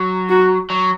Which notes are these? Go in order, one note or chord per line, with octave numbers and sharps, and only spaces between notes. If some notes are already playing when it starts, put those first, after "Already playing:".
Already playing: F#3
F#4
F#3